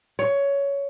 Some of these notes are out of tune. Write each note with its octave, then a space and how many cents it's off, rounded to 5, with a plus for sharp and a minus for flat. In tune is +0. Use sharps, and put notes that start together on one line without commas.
C#5 +15